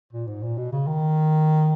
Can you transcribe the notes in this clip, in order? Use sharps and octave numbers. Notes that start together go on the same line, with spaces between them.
A#2
G#2
A#2
B2
C#3
D#3